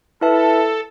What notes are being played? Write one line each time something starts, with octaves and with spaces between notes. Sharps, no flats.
E4 A4 B4 E5 A5